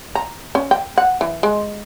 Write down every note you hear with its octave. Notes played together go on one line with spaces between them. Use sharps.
A#5
C#4
G5
F#5
E3
G#3